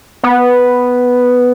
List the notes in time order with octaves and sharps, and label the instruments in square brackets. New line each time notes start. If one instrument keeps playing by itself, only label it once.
[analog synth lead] B3